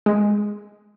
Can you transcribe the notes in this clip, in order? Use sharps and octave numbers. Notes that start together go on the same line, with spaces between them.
G#3